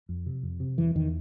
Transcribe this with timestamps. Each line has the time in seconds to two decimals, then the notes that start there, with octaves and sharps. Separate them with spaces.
0.09 F2
0.26 C3
0.43 F2
0.60 C3
0.78 E2 E3
0.95 E2 D#3